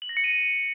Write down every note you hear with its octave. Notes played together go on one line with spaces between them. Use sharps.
F#7
A#6
C#7
D#7